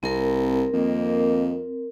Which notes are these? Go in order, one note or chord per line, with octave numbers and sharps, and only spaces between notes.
C2 C4 A#4
F2 D#3 A#3